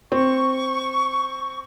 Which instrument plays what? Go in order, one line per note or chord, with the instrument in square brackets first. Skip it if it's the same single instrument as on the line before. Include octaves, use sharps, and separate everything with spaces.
[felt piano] C4 [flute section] C#6